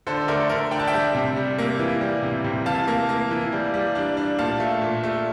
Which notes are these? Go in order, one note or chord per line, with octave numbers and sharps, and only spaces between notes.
D3 A4 C5
A3 A#4 D5
D3 A#4
D4 G5
A5
E5 G5
G3
C3
G3
A#3
E3
G3
C3
C3
E3 F5 A5
A#3
A#3
E3
G3
G3
D4
D4
A#2 F5 A5
A3
A#2
A3